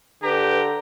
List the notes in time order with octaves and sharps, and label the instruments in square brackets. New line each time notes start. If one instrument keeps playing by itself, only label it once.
[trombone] D3 [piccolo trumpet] G4 [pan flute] B4 [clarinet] A#5